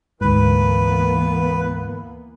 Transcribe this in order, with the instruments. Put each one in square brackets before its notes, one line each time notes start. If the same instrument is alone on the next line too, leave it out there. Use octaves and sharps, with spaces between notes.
[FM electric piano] D2 G#2 [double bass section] E3 A#3 B3 [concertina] B4